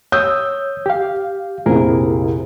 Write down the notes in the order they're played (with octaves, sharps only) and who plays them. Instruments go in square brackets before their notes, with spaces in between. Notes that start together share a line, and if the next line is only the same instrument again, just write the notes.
[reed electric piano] C#5 D#6 E6 [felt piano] G6
[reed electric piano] G4 F5
[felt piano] A#1 F2 C3 [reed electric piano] E4 G#4 A#4